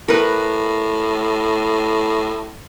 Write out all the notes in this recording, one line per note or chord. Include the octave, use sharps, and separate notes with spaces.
A2 A#4 B4